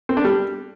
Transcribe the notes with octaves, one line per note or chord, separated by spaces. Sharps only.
C4
D4
G3